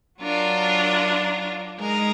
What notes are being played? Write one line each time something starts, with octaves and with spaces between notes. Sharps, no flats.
F#3 D4 F4 A#4
G#3 D#4 A#4